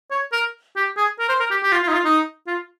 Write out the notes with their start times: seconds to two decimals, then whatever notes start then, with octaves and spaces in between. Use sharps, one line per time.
0.11 C#5
0.32 A#4
0.76 G4
0.97 G#4
1.19 A#4
1.29 C5
1.40 A#4
1.51 G4
1.63 G4
1.72 F4
1.83 F4
1.88 D#4
1.93 F4
2.04 D#4
2.47 F4